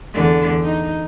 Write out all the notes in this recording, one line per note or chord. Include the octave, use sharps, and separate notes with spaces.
E2 D3
D#4